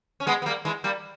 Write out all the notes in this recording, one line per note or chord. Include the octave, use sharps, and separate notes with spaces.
C#4
G#3 B3
B3
G3 A#3
E3 G#3
G3 A#3